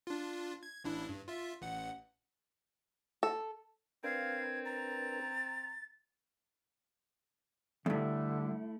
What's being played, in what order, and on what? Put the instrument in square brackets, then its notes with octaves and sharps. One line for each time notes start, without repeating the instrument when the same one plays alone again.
[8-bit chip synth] D4 F4
G#6
A1 D4 E4
G2
F4 E5
A1 F#5
[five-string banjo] A4
[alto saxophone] C4 [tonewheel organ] D4 A#4 B4 [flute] F5 [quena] G#6
[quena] A#5 [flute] A6
[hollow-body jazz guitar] E2 G2 [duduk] D3 [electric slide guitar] A3 E4